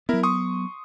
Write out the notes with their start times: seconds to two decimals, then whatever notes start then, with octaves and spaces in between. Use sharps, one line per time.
0.09 F#3 B3 E4 A#4
0.23 C6 C#6 D#6